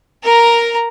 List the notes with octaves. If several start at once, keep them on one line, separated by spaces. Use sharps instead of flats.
A#4 A#5